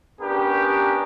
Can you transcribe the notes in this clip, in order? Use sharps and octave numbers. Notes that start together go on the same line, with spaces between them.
B3 C#4 D4 G4 A#4